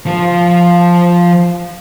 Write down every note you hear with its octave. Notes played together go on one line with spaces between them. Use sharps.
F3 F4